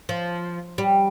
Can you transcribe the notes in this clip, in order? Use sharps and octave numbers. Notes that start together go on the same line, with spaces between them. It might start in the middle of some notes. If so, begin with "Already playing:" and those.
F3
G3